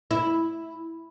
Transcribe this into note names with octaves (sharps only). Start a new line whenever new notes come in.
E4